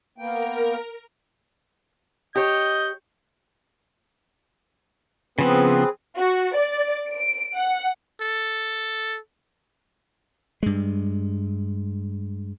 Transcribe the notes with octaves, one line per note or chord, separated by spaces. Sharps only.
A#3 B3 A#4 G5
G4 C#5 D#5 G6
C#3 F3 B3 C4 G#4 B4
F#4
D5
D7
F#5
A4
G2 G#3